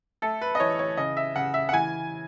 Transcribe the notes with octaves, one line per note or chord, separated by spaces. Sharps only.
A3 A4
B4
D#5
E3 C#5
C#5
C#3 D#5
E5
C#3 F#5
E5
F#5
E3 G#5